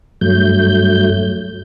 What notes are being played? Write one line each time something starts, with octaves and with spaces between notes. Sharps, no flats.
G2 F#3 A3 G6